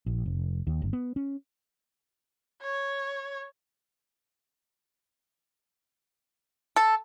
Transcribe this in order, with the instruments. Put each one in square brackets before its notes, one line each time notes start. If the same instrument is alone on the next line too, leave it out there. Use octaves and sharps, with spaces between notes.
[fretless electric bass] A#1
F1
D#2
G1
B3
C#4
[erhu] C#5
[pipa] A4